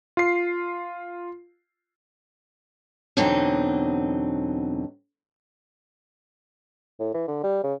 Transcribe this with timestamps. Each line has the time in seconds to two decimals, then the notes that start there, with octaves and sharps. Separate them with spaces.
0.17 F4 C7
3.17 E2 B2 D3 F#3 C4 D#4
7.00 A2
7.14 E3
7.27 D3
7.44 G3
7.63 C#3